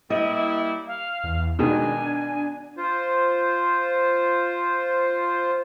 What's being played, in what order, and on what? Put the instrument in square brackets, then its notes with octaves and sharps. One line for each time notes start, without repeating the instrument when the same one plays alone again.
[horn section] G3 A#3 E4 [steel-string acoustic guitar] D#5
[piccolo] F5
[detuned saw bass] E2
[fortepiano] B2 D#3 G#3 [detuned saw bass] D4 [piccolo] G#5
[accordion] F4 C5